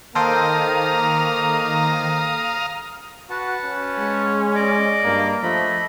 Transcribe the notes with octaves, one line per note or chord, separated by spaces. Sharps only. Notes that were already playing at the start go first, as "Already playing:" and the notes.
D#3 A#3 A4 C5 F5 G5 A#5 D#6
F#4 B4 F#5 A5
C#4
G#3
D5 D#5 D6
G2 A#3
F3 A3 D#5 B5